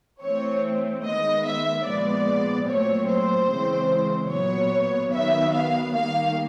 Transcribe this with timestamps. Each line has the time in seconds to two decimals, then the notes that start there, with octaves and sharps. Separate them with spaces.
0.22 E3 A3 C4 C#5
1.04 D#3 G#3 B3 D#5
1.45 E5
1.86 A#2 F3 G#3 B3 D5
2.67 A#2 F#3 A3 C4 C#5
3.08 C5
3.50 C#3 E3 G#3 C4
4.31 A#2 F#3 B3 C#5
5.12 D#3 F#3 B3 E5
5.53 F5
5.94 D#3 G3 A#3 F5